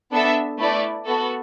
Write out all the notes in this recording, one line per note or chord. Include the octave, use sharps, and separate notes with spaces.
B3 D4 A4 E5
A3 E4 B4 D5
B3 F#4 A4